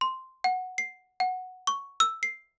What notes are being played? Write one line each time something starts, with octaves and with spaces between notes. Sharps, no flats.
C6
F#5
C7
F#5
C#6
E6
C7